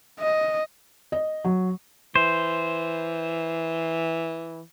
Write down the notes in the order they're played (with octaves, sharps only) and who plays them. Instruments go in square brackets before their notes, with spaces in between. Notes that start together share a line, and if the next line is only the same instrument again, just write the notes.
[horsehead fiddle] D#5
[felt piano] D#5
F#3
[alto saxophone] E3 [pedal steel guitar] C5